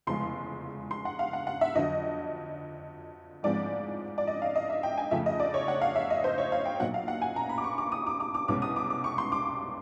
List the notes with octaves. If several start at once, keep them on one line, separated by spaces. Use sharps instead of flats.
F1 E2 C#3 F3 G#3 C6
C6
F#5
F5
F#5
F#5
E5
F2 D3 F#3 D#5
A1 G#2 F3 G#3 C4 D5
D5
D#5
F5
D#5
E5
G5
G#5
F2 C#3 F3 A3 E5
D#5
D5
C#5
F#5
F5
E5
D#5
C5
C#5
F5
G5
B1 A#2 F#3 F#5
F5
F#5
G#5
A#5
B5
D6
C#6
D6
D#6
D6
D6
D6
C2 B2 G#3 C#4 D6
D#6
D6
D6
C#6
C6
D6